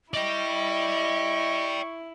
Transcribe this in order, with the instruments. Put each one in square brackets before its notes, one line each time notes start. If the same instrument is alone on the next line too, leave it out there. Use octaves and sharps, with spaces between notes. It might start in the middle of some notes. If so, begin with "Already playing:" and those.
[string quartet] E4 [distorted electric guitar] D5 G5 [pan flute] D#5 [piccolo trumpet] C#6